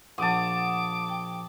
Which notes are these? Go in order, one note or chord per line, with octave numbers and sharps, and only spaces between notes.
A#1 F#5 A5 D6 D#6
G5